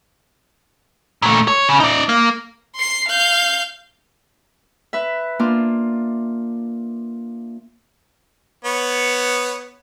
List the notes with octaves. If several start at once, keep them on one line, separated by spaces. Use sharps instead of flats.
A#2 A3
C#5
C#3
D#4 D5
A#3
C6 C7
F5 G6
B4 E5
A#3 D4 F4
B3 C#5